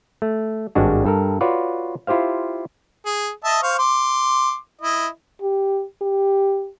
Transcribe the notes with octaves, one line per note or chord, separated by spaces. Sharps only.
A3
G#1 G2 G3 G#3 D4 F#4
G2 A4 A#4
F4 F#4 B4 C#5 D5
E4 F4 G4 C5 F5
G#4
D#5 E5 A5
C5 F5 C#6
C6 D6
E4 D#5
G4
G4